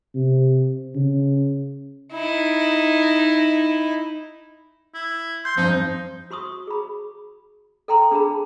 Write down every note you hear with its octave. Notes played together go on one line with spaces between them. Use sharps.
C3
C#3
D#4 E4
E4
C6 G6
G2 F3 C4 D#4
F#4 C6 C#6 D#6
G#4 B5
A4 G5 A#5 C6
D4 G#4 A5 B5